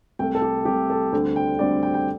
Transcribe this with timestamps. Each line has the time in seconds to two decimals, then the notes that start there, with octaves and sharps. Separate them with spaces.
0.19 C2 C3 A3 G5
0.35 A4
0.42 G4
0.65 C2 C3 A3 G4
0.90 A4
1.13 D2 D3 G3 C4 G5
1.36 G5
1.59 D2 D3 G3 C4 D5
1.83 G5
1.94 G5